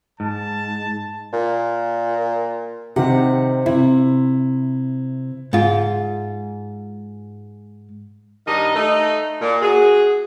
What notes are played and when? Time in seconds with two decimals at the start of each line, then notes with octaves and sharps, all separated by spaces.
0.20 G#2 A5
1.33 A#2
2.96 C3 D#3 C4 F#5
3.66 C3 E4
5.53 G#2 F4
8.46 G2 D#3 G3 D#4 D#5
8.75 A3 D#4
9.41 A#2
9.62 F#4 G#4